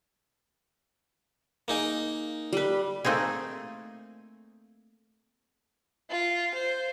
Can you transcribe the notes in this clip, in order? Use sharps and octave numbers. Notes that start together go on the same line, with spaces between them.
A#3 D#4 G#4
G3 B4
A3 A#3 C4 D#4 G#4
F4
C5